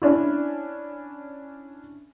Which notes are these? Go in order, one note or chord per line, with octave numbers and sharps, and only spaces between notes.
C#4 D4 E4